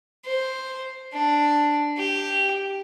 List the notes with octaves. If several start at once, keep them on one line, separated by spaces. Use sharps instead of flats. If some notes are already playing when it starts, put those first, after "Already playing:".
C5
D4
G4